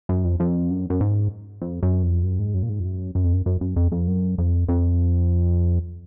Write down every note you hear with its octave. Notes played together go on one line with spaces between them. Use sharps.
F#2
F2
F2
F#2
F#2
G#2
F2
F#2
F2
F#2
G#2
F#2
A#2
G#2
F2
F#2
F#2
F2
F#2
F#2
F#2
F2
F2
F#2
F2
F2